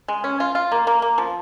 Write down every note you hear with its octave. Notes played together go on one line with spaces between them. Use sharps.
G#3
C#4
F4
F4
A#3
A#3
A#3
F3